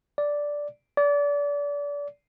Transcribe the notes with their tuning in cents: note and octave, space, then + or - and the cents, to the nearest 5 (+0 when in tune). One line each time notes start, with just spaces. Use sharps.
D5 -5
D5 -30